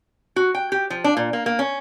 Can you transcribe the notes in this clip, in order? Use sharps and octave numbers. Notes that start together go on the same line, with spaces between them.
F#4
G5
G4
F3
D4
A#2
A#3
A#3
C#4